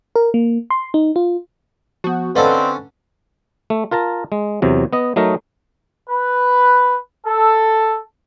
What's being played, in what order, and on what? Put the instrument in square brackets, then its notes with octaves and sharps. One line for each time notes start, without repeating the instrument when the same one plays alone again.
[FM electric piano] A#4
A#3
C6
D#4
F4
[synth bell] F3 B3 [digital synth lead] F#4
[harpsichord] D3 C#4 A4 [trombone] C4 [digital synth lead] B4 [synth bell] D5 D#5 F5
[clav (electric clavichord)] A3
F4 A#4 A5 A#5
G#3
E2 C3 F#3
B3 D#5
F#3 A3 D#4 A#4 D#5
[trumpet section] B4
A4